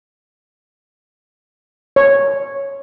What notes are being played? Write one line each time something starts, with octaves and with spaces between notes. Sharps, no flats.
C#5